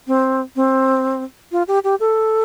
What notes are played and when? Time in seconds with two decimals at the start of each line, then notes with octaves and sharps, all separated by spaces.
0.07 C4
0.56 C4
1.52 F4
1.68 G4
1.84 G4
2.00 A4